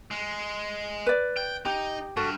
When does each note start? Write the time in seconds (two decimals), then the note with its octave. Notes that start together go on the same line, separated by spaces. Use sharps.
0.11 G#3
1.06 B4 D5
1.37 G5
1.65 D#4 G4
2.17 G2 F#4 A4